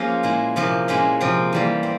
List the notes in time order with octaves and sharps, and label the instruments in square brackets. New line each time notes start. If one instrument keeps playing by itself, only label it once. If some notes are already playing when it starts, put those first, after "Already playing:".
Already playing: [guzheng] F3 A#3 C#4 F4 G#4 C5
A#2 G#3 E4
C3 F3 A#3 E4
A#2 G#3 C#4 E4
C3 F3 C4
E3 G3 A#3
C4